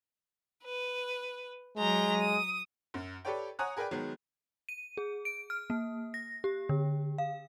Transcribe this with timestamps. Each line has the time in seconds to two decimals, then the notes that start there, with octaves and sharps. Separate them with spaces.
0.62 B4
1.78 F#3 G#3 A#5 G6
2.16 D#6
2.94 F#2
3.25 G4 A4 B4 C#5 D5 G5
3.59 C#5 F#5 G#5 A#5 D#6 F#6
3.77 G#4 A#4 B4 D5 G5
3.91 D#3 F#3 G#3 B3
4.69 D#7
4.97 G#4
5.25 D7
5.50 F6
5.70 A#3
6.14 A#6
6.44 G4
6.69 D3
7.18 F5